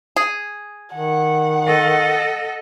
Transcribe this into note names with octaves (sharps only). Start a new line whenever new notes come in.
G#4
D#3 F#5
A4 D#5